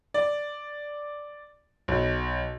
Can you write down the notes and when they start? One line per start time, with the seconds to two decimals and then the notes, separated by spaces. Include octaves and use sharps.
0.14 D5
1.88 B1